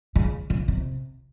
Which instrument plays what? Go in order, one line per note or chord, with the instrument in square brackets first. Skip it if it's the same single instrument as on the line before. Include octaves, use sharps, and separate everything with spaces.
[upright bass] C#3
C#3
C3